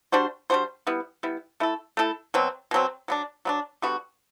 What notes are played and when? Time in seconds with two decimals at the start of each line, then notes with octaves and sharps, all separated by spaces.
0.12 G3 D4 F#4 C5
0.50 G3 D4 F#4 C5
0.87 G3 B3 E4
1.23 G3 B3 E4
1.60 A3 E4 A4
1.97 A3 E4 A4
2.34 B2 F#3 C4
2.71 B2 F#3 C4
3.08 F#3 B3 D4
3.45 F#3 B3 D4
3.82 D3 G3 B3 F#4